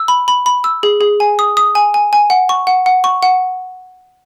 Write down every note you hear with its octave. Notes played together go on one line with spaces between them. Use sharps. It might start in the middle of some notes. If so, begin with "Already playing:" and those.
Already playing: E6
B5
B5
B5
E6
G#4
G#4
G#5
D#6
D#6
G#5
G#5
G#5
F#5
C#6
F#5
F#5
C#6
F#5